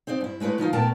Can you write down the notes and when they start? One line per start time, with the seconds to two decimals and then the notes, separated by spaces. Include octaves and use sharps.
0.07 C4 D#4 C5 D5
0.21 G2 E4
0.40 G#3 A3 E4 B4 C#5
0.58 D#3 F3 D#4 F4
0.73 A#2 A3 B3 A#4 G5 A5